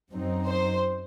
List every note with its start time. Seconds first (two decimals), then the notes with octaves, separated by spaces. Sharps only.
0.11 F#2 F#3 C4 D#4
0.46 C5